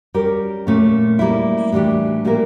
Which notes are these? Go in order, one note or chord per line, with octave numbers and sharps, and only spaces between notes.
G3 C#4 G4 A#4
A#2 A3 C#4
G3 A#3 E4
A2 E3 G3 D4 G4
A#2 G3 A#3 E4 A#4